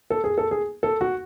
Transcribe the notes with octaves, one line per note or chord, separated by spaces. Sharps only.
A4
G#4
A4
G#4
A4
F#4